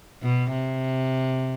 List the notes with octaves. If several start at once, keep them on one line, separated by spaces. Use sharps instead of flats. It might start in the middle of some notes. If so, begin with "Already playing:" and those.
B2
C3